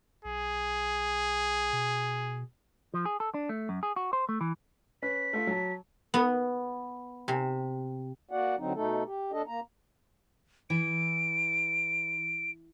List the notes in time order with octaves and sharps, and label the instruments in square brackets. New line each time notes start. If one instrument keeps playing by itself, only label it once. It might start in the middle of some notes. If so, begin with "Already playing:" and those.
[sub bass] B1 [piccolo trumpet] G#4
[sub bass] B2
[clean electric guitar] F3
G#4
A4
D4
A3
F#2
G#4
F#4
C5
A3
E3
[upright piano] C#4 B4 [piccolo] B6
[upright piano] A3 F4
F#3 A5
[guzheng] B3
C3
[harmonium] A#3 F#4 D5 F#5
D3 F#3 C4 D#4
B2 A3 D#4 A4
G4
D2 D4 A4 D#5
A#3 A#5
[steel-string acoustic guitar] E3 [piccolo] D7